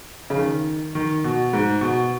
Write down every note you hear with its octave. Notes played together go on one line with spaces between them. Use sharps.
C#3
D#3
D#3
B2
G#2
B2